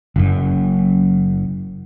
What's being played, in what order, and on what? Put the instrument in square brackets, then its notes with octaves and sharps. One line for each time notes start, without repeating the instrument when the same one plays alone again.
[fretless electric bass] F#1 F#2